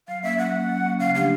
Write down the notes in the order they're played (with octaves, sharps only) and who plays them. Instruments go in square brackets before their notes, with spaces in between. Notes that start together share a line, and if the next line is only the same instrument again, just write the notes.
[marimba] F#3 [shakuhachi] F5
[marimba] A#3 C#4 [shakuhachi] E5
[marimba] F#3 [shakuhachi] F#5
[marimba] A#3 C#4
F#3
A#3 C#4
[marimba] C#3 [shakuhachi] F5
[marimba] F3 A3 D4 G4 [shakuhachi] F5